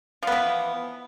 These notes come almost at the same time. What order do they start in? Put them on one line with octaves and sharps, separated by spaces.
F3 B3 E3